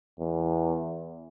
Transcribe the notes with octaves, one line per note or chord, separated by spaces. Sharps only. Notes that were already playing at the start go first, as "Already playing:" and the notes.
E2